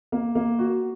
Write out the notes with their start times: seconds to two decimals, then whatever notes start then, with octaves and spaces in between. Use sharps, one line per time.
0.12 A#3
0.35 A#3
0.59 F#4